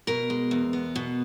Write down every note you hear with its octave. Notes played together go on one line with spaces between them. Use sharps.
B2 A#4
G#3
E2
B3
B2